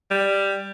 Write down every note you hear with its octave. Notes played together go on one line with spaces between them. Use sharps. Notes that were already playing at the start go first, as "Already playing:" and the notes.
G3